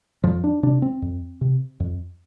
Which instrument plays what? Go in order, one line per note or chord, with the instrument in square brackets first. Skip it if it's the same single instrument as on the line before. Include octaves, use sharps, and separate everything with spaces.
[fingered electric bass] F2 F3
D4
C3 D4
C4
F2
C3
F2